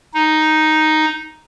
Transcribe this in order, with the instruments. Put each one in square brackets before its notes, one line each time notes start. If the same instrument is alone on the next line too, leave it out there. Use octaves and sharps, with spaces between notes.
[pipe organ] D#4